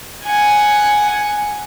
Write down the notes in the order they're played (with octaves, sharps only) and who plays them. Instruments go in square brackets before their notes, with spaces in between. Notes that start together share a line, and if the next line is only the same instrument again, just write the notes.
[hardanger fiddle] F#5 G#5